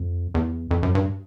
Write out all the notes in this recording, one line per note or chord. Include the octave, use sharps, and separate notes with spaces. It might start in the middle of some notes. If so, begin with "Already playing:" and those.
Already playing: F2
E2
F2
F#2
G2